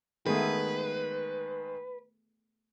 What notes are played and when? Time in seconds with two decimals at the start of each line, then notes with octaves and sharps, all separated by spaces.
0.26 D#3 G#3 A3 B3 G#4 B4